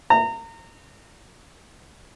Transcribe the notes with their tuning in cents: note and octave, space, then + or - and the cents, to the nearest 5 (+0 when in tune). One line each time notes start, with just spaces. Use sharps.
A#5 -30